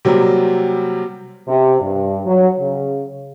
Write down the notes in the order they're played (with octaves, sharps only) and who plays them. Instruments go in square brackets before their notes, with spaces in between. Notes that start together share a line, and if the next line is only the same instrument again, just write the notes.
[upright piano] C3 F#3 G3 A#3 C4
[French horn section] C3
G2
F#3
C#3